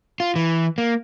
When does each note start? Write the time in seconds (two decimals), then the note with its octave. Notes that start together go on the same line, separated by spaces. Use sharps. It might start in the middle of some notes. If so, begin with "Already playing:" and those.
0.20 F4
0.36 E3
0.78 A#3